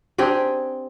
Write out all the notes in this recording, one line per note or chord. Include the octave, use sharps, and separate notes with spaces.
C4 D4 G4 G#4